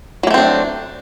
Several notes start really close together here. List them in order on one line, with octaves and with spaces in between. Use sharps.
F#3 A#3 A3 C4 D4